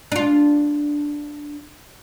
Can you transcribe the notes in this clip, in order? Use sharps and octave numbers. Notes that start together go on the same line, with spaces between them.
D4 F4